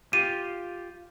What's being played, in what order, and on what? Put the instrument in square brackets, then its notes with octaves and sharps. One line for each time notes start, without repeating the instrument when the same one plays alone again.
[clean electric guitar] F4 G4 [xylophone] D#7